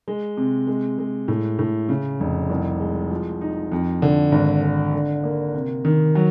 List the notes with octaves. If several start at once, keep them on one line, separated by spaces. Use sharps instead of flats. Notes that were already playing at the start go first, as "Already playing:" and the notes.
G#3
C3
G#3
G#3
A2
A2
C#3
F1
C2
G#3
F3
D#4
F2
D3
G#1
D3
D3
A#3
C3
D#3
F#3